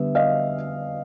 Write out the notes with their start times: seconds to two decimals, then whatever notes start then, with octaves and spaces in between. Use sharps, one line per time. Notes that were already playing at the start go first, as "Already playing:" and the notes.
Already playing: D3 G3 B3 E5
0.15 D#5 F5